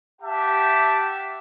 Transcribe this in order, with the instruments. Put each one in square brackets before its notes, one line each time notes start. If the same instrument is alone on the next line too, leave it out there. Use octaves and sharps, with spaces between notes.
[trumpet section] G4 E5 F#5 G5 A5